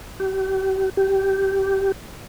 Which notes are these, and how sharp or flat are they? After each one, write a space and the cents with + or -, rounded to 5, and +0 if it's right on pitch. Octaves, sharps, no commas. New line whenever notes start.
G4 -40
G4 -15